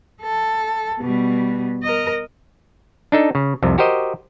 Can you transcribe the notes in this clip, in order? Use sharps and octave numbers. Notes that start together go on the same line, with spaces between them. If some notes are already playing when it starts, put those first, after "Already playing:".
A4
B2 G3
A#4 D#5
D4 D#4 A4
C#3
C2 F2 C3
F#4 G4 A#4 C5 D#5